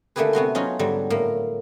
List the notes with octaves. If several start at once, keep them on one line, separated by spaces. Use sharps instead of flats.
D3 A3 A#3 G4 G#4 B4
C3 B3 F#4 C6
F#3 C#4 D#4 F4
G#2 D3 F#3 G3
A2 A#3